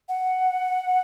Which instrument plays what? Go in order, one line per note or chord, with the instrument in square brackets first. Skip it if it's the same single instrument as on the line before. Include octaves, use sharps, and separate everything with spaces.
[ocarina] F#5